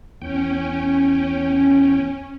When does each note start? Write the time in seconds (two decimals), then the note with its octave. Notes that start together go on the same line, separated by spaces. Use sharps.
0.22 E2 C#4 G5